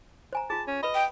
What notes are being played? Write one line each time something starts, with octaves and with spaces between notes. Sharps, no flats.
C5 G#5 A#5
F4 G#4 A5
C#4
B4 D#5 B5
G5